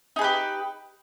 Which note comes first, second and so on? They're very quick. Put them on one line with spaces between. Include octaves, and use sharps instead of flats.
D#4 G#4 B4 G4